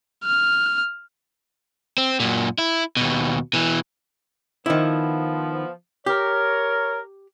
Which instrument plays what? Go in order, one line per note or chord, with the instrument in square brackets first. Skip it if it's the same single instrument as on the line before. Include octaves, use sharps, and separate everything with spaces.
[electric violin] F6
[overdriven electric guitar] C4
F#2 A#2
E4
D#2 B2
B2 E3
[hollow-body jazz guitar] D#3 E4 [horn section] F3 B3
[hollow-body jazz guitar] G4 [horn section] A#4 C#5